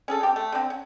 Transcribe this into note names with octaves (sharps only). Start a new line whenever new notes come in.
C#4 G#4 A4
C4 G4
A3
D3 C4
C#4